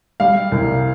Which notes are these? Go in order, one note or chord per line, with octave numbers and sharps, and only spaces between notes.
G3 F5
C2